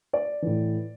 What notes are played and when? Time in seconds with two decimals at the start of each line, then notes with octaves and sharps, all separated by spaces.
0.13 D5
0.42 A2 E3